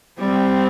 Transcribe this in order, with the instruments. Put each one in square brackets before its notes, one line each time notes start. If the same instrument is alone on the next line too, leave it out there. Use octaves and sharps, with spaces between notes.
[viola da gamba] G3 [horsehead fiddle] C4